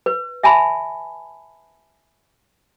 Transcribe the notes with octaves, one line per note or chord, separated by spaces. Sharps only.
B4
E5 G#5 A5 B5